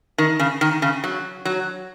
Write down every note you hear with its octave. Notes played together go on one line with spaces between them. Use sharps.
D#3
C#3
D#3
C#3
F#3
F#3